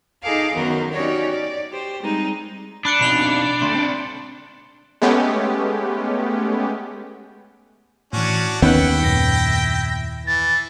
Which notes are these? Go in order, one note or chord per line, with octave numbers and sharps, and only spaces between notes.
D#4 G#4 A4 F5 A5 D6
F#2 D#3 B3 F#4 A#4 D#5
C#4 D#4 F#4 G4 C#5 D5
D5
G4 C5
G3 G#3 C4 D#4
D4 B5 F#6 C#7
B2 C4 D#4 B5 F7 G7
D3 A3 C6
C4 D5
G#3 A3 B3 C#4 G4
A2 E3 C#4 D4 F#4
D#2 D#3 B3 C#4 E4 B4 F#5 G5
F#2 A#2 A#6
E3 A6